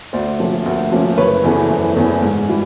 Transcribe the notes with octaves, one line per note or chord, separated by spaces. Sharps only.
D2 C5 D5
C3 F3 A#3 C#4
D2
C3 F3 A#3 C#4
F#1 B4 C#5
E2 C#3 E3 A3
F#1
E2 C#3 E3 A3
G#2
E3 G3